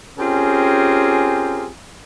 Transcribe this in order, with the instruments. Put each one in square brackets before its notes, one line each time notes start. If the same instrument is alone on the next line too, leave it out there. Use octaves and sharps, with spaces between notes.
[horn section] C4 C#4 F4 G4 G#4 A#4